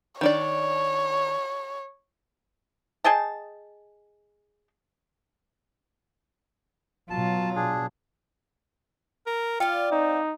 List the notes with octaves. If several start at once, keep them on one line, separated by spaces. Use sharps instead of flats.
D#3 D4 C#5 D5
G#4 D#5 G5 A5
B2 F#3 F4 A5
D4 G#4
A#4
F4 D5 F5 G5
C4 D#4